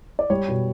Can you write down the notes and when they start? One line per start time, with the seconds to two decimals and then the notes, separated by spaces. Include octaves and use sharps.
0.19 D5
0.30 G3 C#5
0.48 B2